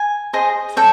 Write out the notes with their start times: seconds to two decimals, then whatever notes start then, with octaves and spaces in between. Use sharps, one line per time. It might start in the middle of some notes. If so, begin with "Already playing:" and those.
Already playing: G#5
0.33 G#4 C5 D#5
0.77 A4 C#5 G5